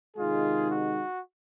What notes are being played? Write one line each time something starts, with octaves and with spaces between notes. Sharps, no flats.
C3 D#3 G#3 D#4 F4 G#4
F#4